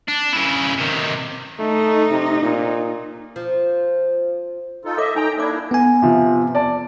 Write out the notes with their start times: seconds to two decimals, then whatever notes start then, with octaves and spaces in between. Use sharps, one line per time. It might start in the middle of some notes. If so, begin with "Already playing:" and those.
0.08 D4
0.33 C#3 E4
0.78 C3 D#3
1.59 A3 D#4
2.10 C3
2.42 A#2
3.36 F3
4.85 D#4 F4 A4
4.98 A4 C#5 D#5 E5 D6
5.15 D#4 A4 G5 G#5 A#5
5.37 A#3 D4 E4 A4 C#5 D6
5.71 B3 G#5
6.02 C3 F3
6.55 D5 A5